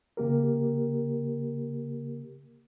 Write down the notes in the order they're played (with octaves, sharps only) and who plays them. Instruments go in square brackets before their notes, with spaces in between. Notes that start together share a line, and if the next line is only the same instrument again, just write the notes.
[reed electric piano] C#3 A#3 G4 A#4